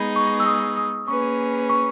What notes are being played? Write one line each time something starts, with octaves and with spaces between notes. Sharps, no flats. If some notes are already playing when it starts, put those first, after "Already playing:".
Already playing: G#3 B3 D#4 G#4 B5
C#6
E6
D#6
D#6
A#3 C#4 G#4 B4 C#6
C#6